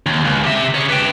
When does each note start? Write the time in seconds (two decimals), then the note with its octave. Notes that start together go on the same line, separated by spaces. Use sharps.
0.06 D#2
0.25 C#2
0.44 G4 E5
0.75 C#3 C#5
0.90 B4 G5